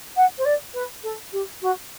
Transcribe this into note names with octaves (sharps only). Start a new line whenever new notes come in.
F#5
C5
D5
B4
A4
G4
F#4